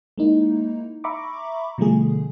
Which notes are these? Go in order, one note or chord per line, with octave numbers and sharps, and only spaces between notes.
G#3 A#3 D#4 E4
E5 A#5 B5 C#6 D6
B2 D3 F3 G3 A3 G#4